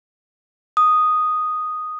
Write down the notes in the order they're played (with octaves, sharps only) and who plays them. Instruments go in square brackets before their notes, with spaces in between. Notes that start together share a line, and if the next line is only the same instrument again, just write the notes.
[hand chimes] D#6